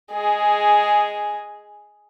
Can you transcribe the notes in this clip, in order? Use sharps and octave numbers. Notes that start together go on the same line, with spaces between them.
G#3 G#4